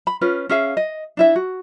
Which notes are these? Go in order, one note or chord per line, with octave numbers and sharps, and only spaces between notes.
B5
C#4 F4 B4
C#4 G#4 E5 F5
D#5
D4 E4 E5
F#4